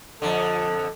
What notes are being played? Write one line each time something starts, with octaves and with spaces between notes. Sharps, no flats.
F2 D3 A4